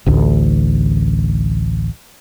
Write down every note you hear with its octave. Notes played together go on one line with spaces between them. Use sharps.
A1 D2